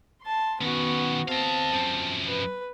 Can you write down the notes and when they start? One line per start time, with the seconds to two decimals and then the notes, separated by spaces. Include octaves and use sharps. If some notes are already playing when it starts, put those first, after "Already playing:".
0.23 A5 C6
0.61 D#3 B3 C#4 F#4
1.28 C4 D#5 F5 A5
1.73 F#2 F3
2.28 B4